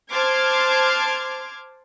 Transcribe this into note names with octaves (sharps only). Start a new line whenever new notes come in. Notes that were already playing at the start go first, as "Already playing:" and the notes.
C5 A5 C6 D6 F6 G#6